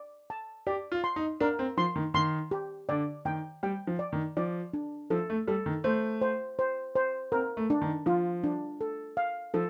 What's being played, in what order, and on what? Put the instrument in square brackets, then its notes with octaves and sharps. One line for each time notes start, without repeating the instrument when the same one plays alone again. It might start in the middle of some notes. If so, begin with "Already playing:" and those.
Already playing: [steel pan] D5
A5
[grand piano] G4 [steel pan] D5
[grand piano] F4
[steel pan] C6
[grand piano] D#4
[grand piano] D4 [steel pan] A#4
[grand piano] C4
[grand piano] F3 [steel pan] C6
[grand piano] D#3
[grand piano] D#3 [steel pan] C6
[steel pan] G4
[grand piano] D3 [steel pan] D5
[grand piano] D#3 [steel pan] G5
[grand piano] G3 [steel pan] G5
[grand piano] F3
[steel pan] D5
[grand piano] D#3
[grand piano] F3 [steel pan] D5
[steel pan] D4
[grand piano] F3 [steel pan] A4
[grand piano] A3
[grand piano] G3 [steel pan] A4
[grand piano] D#3
[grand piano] A3 [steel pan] C5
[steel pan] C5
C5
C5
[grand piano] C4 [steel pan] A#4
[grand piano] A3
[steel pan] D4
[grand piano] D#3
[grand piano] F3 [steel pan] F4
[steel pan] D4
A4
F5
[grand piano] F3 [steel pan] A4